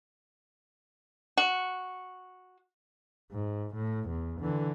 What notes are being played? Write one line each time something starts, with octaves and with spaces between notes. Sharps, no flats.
F#4
G#2
A2
E2
D3 E3